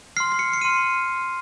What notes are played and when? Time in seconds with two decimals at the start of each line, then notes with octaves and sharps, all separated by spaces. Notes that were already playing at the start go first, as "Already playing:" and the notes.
0.17 C6 F6 C7
0.32 C7
0.39 C#7
0.53 C#7
0.61 C6 F6 D#7